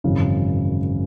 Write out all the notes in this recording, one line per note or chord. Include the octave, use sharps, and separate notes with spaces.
G#1 F#2 C#3 E3